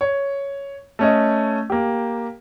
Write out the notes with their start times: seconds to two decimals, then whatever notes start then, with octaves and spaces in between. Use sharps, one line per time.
0.01 C#5
0.99 A3 C#4 D#5
1.70 A#3 G4